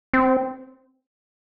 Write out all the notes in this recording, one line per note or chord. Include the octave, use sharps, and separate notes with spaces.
C4